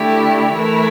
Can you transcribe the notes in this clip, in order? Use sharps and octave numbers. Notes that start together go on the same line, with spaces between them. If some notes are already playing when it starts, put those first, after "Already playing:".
Already playing: D3 A3 E4 G4
E3 A3 E4 A#4